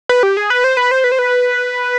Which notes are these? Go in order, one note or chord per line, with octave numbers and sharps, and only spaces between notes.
B4
G4
G#4
B4
C5
B4
C5
B4
C5
B4